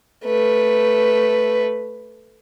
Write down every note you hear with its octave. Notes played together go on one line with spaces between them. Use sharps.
A3 B4